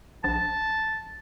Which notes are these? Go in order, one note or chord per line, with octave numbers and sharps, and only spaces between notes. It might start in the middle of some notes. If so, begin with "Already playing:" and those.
A#1 A5